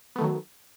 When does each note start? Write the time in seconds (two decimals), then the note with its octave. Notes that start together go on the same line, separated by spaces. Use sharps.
0.16 B3
0.18 A3
0.21 D#3
0.24 F#3